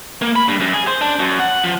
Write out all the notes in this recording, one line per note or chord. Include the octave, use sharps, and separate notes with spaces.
A#3
B5
G2
F#2
G#4
C5
D4
F#2
F#5
F3